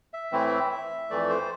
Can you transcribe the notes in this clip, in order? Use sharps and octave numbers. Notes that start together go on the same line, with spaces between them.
E5
A2 E3 A3 C4 E4
F2 E3 A3 D5
C5